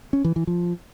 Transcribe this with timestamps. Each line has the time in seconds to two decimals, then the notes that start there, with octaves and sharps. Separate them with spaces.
0.13 C#4
0.24 E3
0.36 E3
0.47 F3